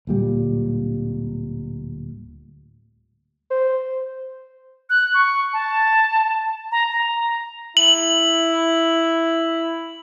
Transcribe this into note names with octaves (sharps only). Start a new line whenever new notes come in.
D1 A#2 G3
C5
F#6
C#6
A5
A#5
A#5
E4 F#7